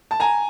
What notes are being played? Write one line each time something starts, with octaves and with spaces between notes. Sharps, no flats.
A5
G#5 A#5